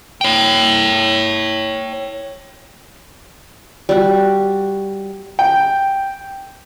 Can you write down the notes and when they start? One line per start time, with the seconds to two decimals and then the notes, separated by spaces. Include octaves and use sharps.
0.21 C#5 G5
3.89 G3 F#4
5.39 G5